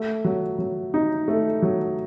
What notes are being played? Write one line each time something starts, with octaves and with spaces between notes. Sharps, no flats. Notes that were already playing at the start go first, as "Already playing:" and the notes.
Already playing: A3
F#3
F#3
D#4
A3
F#3